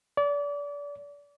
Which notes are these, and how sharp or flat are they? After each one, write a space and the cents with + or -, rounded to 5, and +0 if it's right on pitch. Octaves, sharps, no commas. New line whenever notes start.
D5 -30